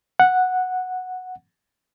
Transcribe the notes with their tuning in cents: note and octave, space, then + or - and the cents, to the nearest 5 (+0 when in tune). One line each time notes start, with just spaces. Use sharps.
F#5 -5